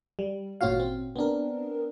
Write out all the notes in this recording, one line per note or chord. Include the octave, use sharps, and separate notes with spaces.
G3
G#1 A#2 C#4 F4 F#4 F5
C4
B3 C4 D4 A#4